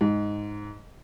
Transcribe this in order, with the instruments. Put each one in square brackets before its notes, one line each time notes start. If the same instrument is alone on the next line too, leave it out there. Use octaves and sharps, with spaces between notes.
[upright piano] G#2